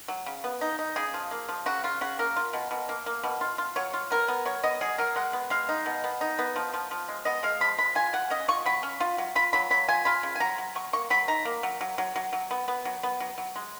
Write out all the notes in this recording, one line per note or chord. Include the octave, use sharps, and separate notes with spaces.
F#3
C#3
B3
D#4
D#4
C#3 G#4
F3
A#3
F3
C#3 F#4
C#3 F4
C#3 F#4
A#3 A#4
F4
B2
B2
A#3
A#3
B2
F4
F4
F#3 C#5
F4
B3 A#4
B3
F#3 C#5
B3 D#5
F#3 G#4
F#3 A#4
G#3 F#5
B3
G#3 F5
D#4
B2
B3
D#4
B3
F3
F3
F3
G#3
B3 D#5
G#3 F5
F3 B5
G#3 B5
F4 G#5
F#3 F#5
C#4 D#5
F4 C#6
F#3 B5
C#4
F4
F#3
F4 B5
F#3 B5
F#3 B5
F4 G#5
F4 B5
C#3
G#5
F#3 A#5
F#3
F#3 C#6
A#3 C#6
F#3 B5
D#4 A#5
A#3
F#3
F#3
F#3
F#3
F#3
B3
B3
F#3
B3
F#3
F#3
G#3